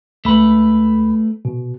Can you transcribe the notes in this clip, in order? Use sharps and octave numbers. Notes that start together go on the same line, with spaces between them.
C#2 A3 B4 B5
B2